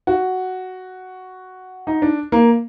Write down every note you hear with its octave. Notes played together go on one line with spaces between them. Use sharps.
F#4
D#4
D4
A#3